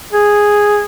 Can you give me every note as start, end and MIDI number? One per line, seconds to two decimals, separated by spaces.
0.13 0.84 68